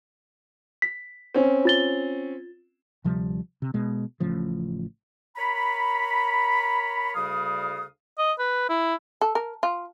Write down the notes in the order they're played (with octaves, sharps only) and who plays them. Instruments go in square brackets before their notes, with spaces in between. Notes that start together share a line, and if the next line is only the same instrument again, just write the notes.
[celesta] B6
[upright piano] C4 C#4
[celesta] F4 A6 G7
[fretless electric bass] D2 C3 F3 G3
C3
B2 G#3
A1 A2 C#3 F3
[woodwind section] A#4 C#5 A#5 B5
D2 C#3 G3 F5 D#6
[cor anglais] D#5
B4
E4
[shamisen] A4
A#4
F4